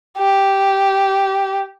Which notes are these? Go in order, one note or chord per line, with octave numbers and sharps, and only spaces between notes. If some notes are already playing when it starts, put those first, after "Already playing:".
G4